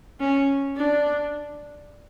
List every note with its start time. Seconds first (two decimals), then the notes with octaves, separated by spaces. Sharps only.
0.20 C#4
0.77 D4